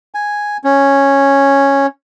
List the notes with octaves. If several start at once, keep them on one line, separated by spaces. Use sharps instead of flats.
G#5
C#4